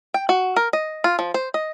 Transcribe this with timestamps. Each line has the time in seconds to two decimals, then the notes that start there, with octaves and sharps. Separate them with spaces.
0.14 G5
0.29 F#4
0.56 A#4
0.73 D#5
1.04 F4
1.19 F3
1.34 C5
1.54 D#5